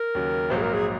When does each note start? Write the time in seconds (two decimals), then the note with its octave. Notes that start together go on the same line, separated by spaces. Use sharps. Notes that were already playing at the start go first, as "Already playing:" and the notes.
Already playing: A#4
0.15 D#2 C#3 F#3
0.50 A#1 G#2 F#3 A#3 C5
0.57 G#4
0.62 A#4
0.74 G#4